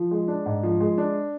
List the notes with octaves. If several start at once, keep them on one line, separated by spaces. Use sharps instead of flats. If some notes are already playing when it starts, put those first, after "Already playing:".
Already playing: F3
G#3
D4
G#2
F3
G#3
D4